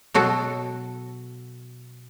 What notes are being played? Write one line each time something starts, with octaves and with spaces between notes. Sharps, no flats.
B2 F#3 F#4 A4